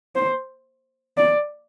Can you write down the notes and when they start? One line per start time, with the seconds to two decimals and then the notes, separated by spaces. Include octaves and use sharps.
0.16 C5
1.17 D5